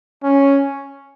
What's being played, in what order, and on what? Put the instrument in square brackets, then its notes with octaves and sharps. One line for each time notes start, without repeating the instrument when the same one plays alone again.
[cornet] C#4